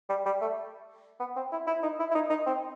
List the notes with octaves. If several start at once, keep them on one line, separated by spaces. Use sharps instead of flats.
G3
G3
A3
B3
C4
E4
E4
D#4
E4
E4
D#4
D#4
C4